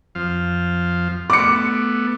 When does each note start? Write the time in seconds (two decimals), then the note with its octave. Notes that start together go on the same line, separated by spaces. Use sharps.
0.15 F2 F3 F5
1.30 A3 B3 D6 C#7